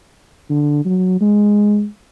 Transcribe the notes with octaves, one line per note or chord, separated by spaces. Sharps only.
D3
F#3
G#3